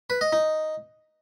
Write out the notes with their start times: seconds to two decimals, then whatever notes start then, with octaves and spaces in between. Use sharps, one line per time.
0.10 B4
0.21 D#5
0.33 D#4